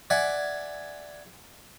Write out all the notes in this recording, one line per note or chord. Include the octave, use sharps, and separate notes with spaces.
D5 E5 F#5 G#5